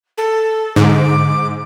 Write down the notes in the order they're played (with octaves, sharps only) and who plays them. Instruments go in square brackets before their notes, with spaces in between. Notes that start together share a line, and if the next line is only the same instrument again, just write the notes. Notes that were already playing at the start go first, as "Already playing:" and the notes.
[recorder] A4
[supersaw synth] G#2 [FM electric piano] D3 [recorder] D6